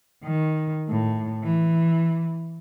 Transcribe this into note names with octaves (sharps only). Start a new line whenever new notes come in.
D#3
A2
E3